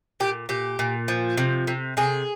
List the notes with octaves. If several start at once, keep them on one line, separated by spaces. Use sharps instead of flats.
A#2 G4
A#2 G4
A#2
F3
C3
C3
C3 G#4